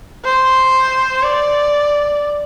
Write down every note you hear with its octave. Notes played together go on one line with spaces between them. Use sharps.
C5
D5